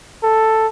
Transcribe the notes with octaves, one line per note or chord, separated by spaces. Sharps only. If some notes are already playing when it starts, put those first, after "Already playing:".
A4